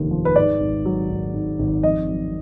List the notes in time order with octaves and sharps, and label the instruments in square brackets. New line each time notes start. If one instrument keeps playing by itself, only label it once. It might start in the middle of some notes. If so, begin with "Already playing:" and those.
Already playing: [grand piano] F1 D#2 D3 F3
F3
B4
G#2 D5
G#1
F#3
G#1
G#2
G#1
F2 D#5
F#3